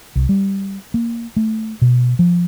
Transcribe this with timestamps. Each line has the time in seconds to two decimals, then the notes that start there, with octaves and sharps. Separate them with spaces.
0.15 C2
0.29 G3
0.94 A#3
1.36 A3
1.82 B2
2.19 F3